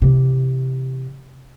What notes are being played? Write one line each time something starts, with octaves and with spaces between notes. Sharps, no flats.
C3 E3